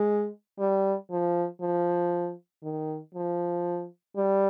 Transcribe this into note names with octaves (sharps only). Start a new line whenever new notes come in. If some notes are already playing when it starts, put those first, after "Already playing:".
Already playing: G#3
G3
F3
F3
D#3
F3
G3